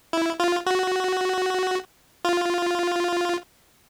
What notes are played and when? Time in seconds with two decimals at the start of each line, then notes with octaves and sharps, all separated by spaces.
0.13 E4
0.40 F4
0.66 F#4
2.25 F4